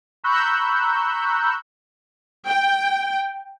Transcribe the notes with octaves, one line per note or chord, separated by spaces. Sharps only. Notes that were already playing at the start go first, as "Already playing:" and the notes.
A#5 B5 C#6 E6 F#6 G6
G5